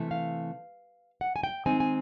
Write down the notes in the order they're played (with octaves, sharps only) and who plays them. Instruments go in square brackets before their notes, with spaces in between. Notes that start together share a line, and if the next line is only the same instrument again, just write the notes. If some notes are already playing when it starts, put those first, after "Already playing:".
Already playing: [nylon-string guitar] C3 E3 A3
F5
F#5
G#5
G5
D#3 G#3 C4 D#4 G#5
G#5